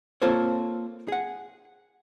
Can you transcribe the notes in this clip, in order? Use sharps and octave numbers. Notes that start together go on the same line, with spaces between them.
A#3 C4 F4 A4 C5 C#5
G#4 F#5